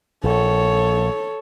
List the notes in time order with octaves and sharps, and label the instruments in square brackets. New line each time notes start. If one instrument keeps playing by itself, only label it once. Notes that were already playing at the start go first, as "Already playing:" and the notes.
[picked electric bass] A#1 [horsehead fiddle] A4 C#5